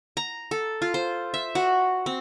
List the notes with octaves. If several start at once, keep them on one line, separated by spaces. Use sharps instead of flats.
A#5
A4
F4
C5
E5
F#4
C4